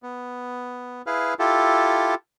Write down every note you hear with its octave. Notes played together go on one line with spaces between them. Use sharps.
B3
E4 G#4 B4 F5
E4 F4 G4 A4